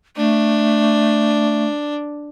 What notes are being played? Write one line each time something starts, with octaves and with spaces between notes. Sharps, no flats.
A3 D4